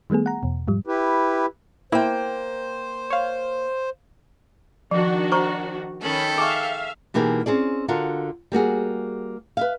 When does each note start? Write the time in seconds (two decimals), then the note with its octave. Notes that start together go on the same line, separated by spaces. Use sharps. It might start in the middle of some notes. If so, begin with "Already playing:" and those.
0.10 D#3 G3 A3 B3 G#4
0.26 F#5 A#5
0.43 E2 B2
0.68 G#2 F3 G3
0.87 E4 G4 B4
1.92 A#3 E4 C5 G5
3.10 C#5 F5
4.91 D#3 F3 D4 F#4
5.32 C5 A#5 C#6
6.02 D#3 C#4 A4 G5 B5
6.38 G#4 E5 F5 G#5 C#6
7.14 B2 E3 A#3 D#4 G4 G#4
7.46 C4 C#4 G#4 D5
7.88 D3 D4 F4 F#4 A#4
8.52 G3 A#3 F#4 G#4
9.57 B4 E5 F5